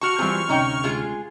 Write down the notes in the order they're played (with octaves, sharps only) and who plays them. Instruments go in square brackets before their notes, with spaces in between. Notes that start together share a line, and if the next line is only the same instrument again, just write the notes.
[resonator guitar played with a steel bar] F#4 A5 [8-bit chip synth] C#6 F6
[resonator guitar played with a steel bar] E3 C4 [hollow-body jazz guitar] G3 F4 G#4
[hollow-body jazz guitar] D2 C3 C#4 [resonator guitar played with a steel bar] D#4 C#5 G5
[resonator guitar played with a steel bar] G#3 F4 G#4